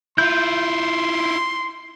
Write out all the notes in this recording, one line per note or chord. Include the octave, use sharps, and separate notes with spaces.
E4 F4 C6 G6